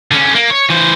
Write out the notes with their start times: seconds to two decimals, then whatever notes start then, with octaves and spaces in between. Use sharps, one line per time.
0.11 D3 C#4
0.35 A#3
0.51 C#5
0.70 E3 C5